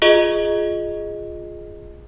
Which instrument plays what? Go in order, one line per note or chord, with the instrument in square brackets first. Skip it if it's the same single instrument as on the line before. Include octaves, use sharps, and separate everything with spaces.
[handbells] F4 G#4 D#5